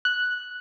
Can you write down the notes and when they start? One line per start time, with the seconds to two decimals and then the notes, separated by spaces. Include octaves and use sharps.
0.05 F#6